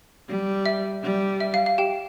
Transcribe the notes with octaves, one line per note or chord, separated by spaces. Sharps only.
G3
E5
G3
E5
F5
F5
G4 G5